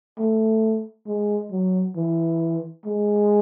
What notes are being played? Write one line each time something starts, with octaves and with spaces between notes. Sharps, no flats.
A3
G#3
F#3
E3
G#3